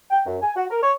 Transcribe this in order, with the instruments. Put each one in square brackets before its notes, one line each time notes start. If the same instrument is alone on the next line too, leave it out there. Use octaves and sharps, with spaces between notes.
[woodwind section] G5
F#2
G#5
F#4
A#4
C#5